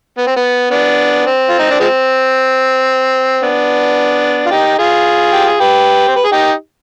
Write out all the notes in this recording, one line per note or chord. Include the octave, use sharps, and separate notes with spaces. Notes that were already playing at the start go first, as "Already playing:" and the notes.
B3
C4
B3
B3 D4
C4
F4
D#4
D4
F3 G#3 C4
B3 D4
F4
D#4 G4
F4 G#4
G4
G#4
G4 B4
C5
B4
G#4
D#4 G4